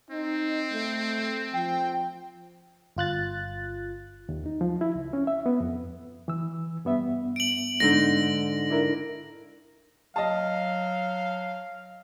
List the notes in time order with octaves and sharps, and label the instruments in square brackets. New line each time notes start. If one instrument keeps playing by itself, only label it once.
[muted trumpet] C4 [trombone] D#4
[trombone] A3
[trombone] F3 [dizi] G5
[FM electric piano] G1 F4 F#6 A6
[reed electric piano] D#2
D#4
F3
E4
C#2
C#4
E5
B3
F2
E3 E6
G2 B3 E5
[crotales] D7 F#7
[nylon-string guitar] G#2 D3 D#4 [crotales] A#6
[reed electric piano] D4 E4 A#4
[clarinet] F#3 [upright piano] D#5 A5 [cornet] F5